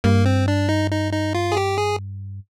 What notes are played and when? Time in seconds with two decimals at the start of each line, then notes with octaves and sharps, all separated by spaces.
0.04 G2 A#3
0.25 C4
0.48 D4
0.69 D#4
0.91 D#4
1.13 D#4
1.35 F4
1.52 G#4
1.57 G4
1.78 G#4